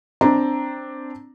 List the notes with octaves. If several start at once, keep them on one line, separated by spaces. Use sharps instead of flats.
C4 D4 A#5